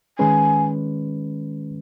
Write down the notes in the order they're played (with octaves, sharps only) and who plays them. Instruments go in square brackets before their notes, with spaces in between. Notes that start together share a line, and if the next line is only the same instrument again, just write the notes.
[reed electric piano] D#3 G#3 C#4 B4 [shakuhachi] G#5